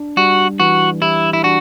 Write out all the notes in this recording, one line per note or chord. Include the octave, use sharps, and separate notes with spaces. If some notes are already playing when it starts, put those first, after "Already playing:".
Already playing: D4
G3 F#4
E3 F#4
E4 G4
E4
D4 F#4